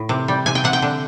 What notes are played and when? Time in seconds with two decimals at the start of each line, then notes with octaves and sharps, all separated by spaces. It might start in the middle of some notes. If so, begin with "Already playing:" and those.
Already playing: A2
0.09 C3
0.28 G3
0.46 C3 G#5
0.55 G5
0.64 C3 F#5
0.73 G5
0.82 D3